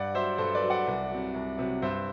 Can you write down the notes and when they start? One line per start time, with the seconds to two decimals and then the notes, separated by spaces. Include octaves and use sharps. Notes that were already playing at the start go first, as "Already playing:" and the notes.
Already playing: G2 D5 F#5
0.14 F#3 C5 E5
0.38 G2 A4 C5
0.55 B4 D5
0.62 F#3
0.70 D5 F#5
0.87 C2
1.10 C3 F#3
1.34 C2
1.58 C3 F#3
1.82 G2 C5 E5